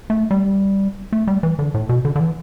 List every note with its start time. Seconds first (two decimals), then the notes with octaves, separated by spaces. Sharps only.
0.10 A3
0.31 G3
1.13 A3
1.27 G3
1.43 E3
1.59 D3
1.74 A2
1.89 B2
2.05 D3
2.16 D3
2.20 E3